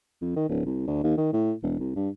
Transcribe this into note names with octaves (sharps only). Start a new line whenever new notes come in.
F2
D#3
D1
C2
D2
D#2
D#3
A2
E1
C2
G2